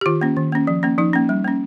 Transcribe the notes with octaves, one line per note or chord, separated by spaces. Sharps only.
G4
D#3 F4
A#3 C#4
D#3
A#3 C#4
F3
A#3 C#4
F3 D#4
A#3 C#4
G3
A#3 C#4